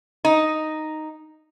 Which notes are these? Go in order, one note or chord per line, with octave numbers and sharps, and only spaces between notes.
D#4